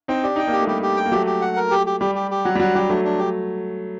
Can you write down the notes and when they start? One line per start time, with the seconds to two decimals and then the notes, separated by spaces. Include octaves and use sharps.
0.08 C4 D#4 G5
0.23 D4 G4
0.36 D#4 G5
0.48 A#3 D4 G4
0.62 A3
0.67 G3 G4
0.82 G4
0.97 G5
1.05 A#3
1.11 F#3 A3 G4
1.26 G4
1.41 F#5
1.57 A#4
1.71 G4
1.87 G4
2.00 G3 G4
2.15 G4
2.31 G4
2.45 F#3 F#5
2.56 G3
2.60 F#3 F#5
2.75 G3 G4
2.89 F#3 A3 D4
3.05 D4
3.19 G4